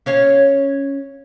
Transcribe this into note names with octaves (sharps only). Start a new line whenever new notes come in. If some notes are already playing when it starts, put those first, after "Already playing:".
C#4 C#5 F5